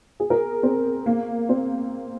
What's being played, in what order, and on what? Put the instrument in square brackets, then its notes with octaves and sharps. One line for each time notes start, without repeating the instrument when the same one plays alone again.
[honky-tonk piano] G#4
A#4
C4
A#3
C4